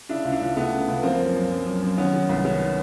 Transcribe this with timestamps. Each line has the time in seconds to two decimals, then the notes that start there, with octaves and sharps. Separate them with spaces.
0.09 C#3 D4 E4
0.25 C#2
0.32 D4 E4
0.41 C#2
0.56 C#2 A3 B3
0.72 C#3
0.88 C#2
1.03 F3 A#3 C4
1.19 F#2
1.35 F#2
1.51 F#2
1.66 F#2
1.82 F#2
1.97 D#3 B3 C#4
2.13 D#3
2.29 C2
2.45 D#3 B3 C#4